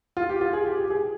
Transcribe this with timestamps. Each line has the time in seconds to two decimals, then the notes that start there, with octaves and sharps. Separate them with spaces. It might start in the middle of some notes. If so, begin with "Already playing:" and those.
0.17 F4
0.29 G4
0.41 F4
0.53 G#4
0.65 G4
0.78 G4
0.90 G#4